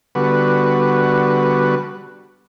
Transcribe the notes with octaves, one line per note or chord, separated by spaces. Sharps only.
D3 G3 B3 F#4 B4